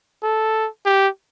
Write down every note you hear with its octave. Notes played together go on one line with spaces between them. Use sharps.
A4
G4